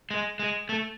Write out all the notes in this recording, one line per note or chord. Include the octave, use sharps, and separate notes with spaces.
G#3
G#3
A3